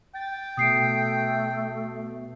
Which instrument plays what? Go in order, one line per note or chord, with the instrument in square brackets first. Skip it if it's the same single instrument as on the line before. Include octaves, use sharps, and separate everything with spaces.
[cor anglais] G5 [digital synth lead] A6
[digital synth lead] B2 [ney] A3 [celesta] D#6 C7 D7